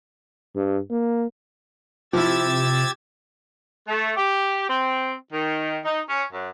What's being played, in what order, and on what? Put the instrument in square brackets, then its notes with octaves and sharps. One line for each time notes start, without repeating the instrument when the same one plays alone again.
[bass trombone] G2
A#3
[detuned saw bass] C3 [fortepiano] F3 E4 [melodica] G4 [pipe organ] E6 G#6 A6
[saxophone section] A3
G4
C4
D#3
D#4
C#4
F#2